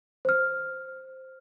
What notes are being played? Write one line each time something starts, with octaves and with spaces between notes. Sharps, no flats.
C5 F6